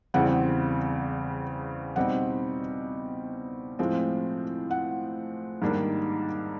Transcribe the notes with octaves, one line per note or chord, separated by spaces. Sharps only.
E2 C#3 E3 G3 C4 F#5
B2 G3 C4 D#4 F#5
A2 F3 G#3 C4
F#5
G#2 D#3 G3 A#3 D4